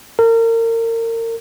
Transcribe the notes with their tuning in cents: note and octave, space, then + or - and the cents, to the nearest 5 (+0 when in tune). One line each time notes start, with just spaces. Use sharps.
A#4 -30